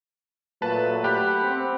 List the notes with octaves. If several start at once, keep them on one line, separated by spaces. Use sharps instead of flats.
A#2 F#3 A3 B4 A5
G4 F#5 B5
C4